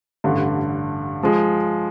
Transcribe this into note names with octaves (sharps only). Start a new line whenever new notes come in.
A1 G2 D3
F3 G#3